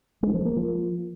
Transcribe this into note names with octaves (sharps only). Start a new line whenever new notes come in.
G#3
F3
A#3
F3